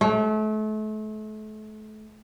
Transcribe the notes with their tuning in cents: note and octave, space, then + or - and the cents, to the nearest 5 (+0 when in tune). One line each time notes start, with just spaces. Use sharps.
A3 -35